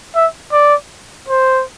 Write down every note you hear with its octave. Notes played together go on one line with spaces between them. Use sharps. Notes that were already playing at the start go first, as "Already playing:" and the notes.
E5
D5
C5